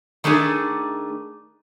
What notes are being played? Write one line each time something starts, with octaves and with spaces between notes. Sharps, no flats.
D#3 A3 D4 G#4